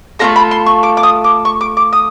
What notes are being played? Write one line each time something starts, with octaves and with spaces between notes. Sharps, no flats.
A3 C4 F4 A4 A#5
B5
C6
C#6
D6
D6
D#6
D6
C#6
D6
D6
D#6